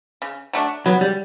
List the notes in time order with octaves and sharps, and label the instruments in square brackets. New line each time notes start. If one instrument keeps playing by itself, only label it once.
[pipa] C#3
F#3 A3 D4
[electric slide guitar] F#3 [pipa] B3
[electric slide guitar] G3